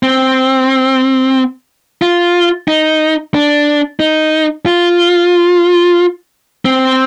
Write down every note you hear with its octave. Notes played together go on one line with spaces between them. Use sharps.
C4
F4
D#4
D4
D#4
F4
C4